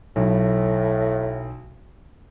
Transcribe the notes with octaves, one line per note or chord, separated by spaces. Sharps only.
B1 A2